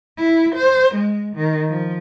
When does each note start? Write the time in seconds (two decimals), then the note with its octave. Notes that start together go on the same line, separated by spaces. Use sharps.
0.18 E4
0.55 C5
0.95 G#3
1.36 D#3
1.69 F3